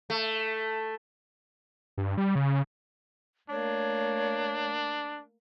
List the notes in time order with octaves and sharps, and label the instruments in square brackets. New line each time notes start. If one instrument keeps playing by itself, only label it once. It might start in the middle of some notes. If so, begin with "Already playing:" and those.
[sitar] A3
[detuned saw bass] G2
G3
C#3
[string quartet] A3 A#3 [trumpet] D4 [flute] C#5